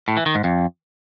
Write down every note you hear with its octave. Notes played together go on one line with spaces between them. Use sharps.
A2
E3
D#3
G#2
F2